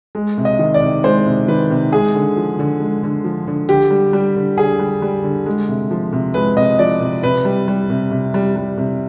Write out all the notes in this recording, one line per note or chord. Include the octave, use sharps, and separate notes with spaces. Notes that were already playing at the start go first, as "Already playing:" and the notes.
G#3
C3
D#5
D#3
D5
C3
G#3 C5
C3
D#3 B4
C3
G#3 G#4
D3
F3
D3
G#3
D3
F3
D3
D3 G4
G3
G3
D3
D3 G#4
G3
G3
D3
G#3
C3
F3
C3
G#3 B4
C3 D#5
F3 D5
C3
C3 B4
G3
G3
C3
C3
G3
G3
C3